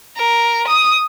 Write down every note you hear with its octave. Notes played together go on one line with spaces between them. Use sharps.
A#4
D#6